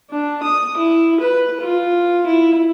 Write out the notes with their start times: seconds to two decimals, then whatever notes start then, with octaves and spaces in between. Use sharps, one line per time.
0.10 D4
0.43 D#6
0.77 E4
1.20 B4
1.61 F4
2.26 E4